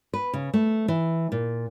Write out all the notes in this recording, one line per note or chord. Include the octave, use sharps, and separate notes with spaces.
B4
C#3
A3
E3
A#2